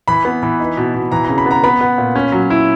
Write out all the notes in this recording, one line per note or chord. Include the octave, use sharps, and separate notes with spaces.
E3 B5
B3
E3
D#4
B2
B2
E3 A#5
C#3 A#5
B5
B3 A#5
B3 B5
B3
A#2
C#4
F#3
E4